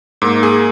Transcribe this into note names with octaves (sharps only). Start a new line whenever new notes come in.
G#2 A#3
G#4